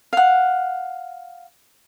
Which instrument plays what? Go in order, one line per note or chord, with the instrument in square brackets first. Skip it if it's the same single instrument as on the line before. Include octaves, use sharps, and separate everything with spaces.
[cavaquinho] F5 F#5